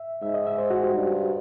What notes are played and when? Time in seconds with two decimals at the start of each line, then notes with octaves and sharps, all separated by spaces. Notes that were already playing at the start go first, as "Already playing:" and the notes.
Already playing: E5
0.23 G#2 E5
0.34 D#5
0.47 E5
0.58 C5
0.70 F#4
0.82 G4
0.94 G2